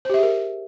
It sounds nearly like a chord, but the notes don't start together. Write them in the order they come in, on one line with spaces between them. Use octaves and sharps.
C5 G4 E5 G#4 A#4